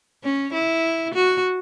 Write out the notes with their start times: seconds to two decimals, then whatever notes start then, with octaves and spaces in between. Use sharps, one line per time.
0.24 C#4
0.53 E4
1.14 F#4